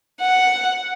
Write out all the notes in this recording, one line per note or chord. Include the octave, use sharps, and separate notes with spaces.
F#5